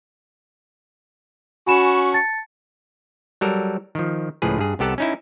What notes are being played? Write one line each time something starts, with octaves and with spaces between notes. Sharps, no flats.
C#4 F#4 G#5 B5 E7
A5 A6 C#7
F#3 G3 A4 A#4
D#3 F3
C#2 A2 F3 G#4 B4
G2 G#4
C2 B3 G4 A4 F#5 A5
C#4 D#4 E4